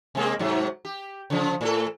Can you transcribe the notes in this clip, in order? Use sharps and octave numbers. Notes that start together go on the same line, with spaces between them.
C3 G#3 A#3
G#2 C3 F#3
G4
C#3 F3
A2 F#4 A4